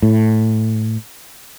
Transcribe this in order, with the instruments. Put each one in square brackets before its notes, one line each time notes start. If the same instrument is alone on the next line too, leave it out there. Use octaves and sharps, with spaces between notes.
[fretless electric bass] A2